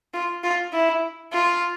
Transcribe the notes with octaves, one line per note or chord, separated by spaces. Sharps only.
F4
F4
E4
F4